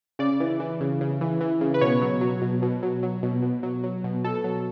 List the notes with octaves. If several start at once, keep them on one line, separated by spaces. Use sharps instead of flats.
C#3 D5
E3
E3
C#3
C#3
E3
E3
C#3
B4
B2 C#5
F#3
F#3
B2
B2
F#3
F#3
B2
B2
F#3
F#3
B2
B2 A4
F#3